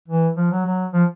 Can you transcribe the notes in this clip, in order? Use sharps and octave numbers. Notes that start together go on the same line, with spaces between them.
E3
F3
F#3
F#3
F3